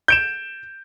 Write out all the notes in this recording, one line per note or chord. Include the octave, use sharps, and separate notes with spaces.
G6 D7 E7